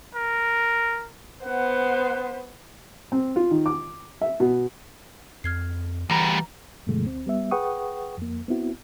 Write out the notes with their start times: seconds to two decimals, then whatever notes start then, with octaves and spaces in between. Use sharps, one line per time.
0.15 A#4
1.45 B3 C5 F#5
3.12 C4
3.36 F4
3.51 D#3
3.66 D6
4.21 E5
4.40 B2
5.44 F2 F6 G#6 C7
6.10 D2 E3 G3 A#5 A#6
6.87 G2 B2 D3 F3 G#3 A3
7.04 D2 C4
7.26 G3 B3 E5
7.51 G#4 B4 F#5 G5 C#6 D#6
8.18 F2 A#3
8.48 B3 C4 E4 F#4